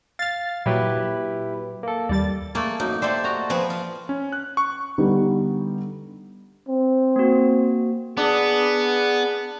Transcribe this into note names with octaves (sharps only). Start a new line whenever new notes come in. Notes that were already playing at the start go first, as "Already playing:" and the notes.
F5 F6 A6
A#2 F#3 E4 G4 B4
A#3 A4
D#2 G3 D5 A6
A3 A#3 G#4 A4
F#2 D#4
A3 G4 A4 C5 D5 E5
F#4 D#5 A#5
F3 C4 G#4 B4
F4
C#4
F#6
C#6
D3 G3 B3 D#4
C4
A#3 F#4
B3 D4 G#4